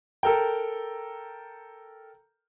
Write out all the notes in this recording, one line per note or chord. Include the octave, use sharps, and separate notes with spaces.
A4 A#4 G5